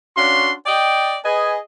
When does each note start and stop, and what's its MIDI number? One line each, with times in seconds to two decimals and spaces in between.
0.17 0.53 61
0.17 0.53 62
0.17 0.53 66
0.17 0.53 77
0.17 0.53 84
0.66 1.15 74
0.66 1.15 75
0.66 1.15 79
1.25 1.57 68
1.25 1.57 71
1.25 1.57 75
1.25 1.57 80